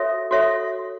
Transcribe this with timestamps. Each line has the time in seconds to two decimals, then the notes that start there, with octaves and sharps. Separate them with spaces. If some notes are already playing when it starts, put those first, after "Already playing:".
Already playing: F#4 A4 C#5 E5
0.31 F#4 A4 C#5 E5